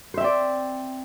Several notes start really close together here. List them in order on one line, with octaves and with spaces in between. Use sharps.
C5 E5 C4 D5